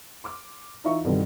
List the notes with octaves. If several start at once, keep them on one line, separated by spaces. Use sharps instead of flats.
C6 D6 F6
E3 D#4 F4 E5 C#6
C2 G2 B2 D3 D#3